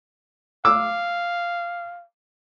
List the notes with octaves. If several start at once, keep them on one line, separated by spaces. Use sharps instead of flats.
F5 D6 E6